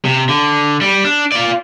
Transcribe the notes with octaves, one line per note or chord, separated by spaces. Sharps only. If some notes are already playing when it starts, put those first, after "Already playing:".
C3
D3
G3
D4
F4 D5